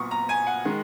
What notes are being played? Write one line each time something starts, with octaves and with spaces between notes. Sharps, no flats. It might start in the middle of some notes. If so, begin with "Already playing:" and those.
Already playing: B1 A#2 B3 C#6 D#6
A#5
G#5
F#5
D#3 G#3